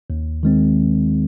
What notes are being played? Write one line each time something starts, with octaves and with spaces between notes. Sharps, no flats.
D#2
D#3 G#3 C4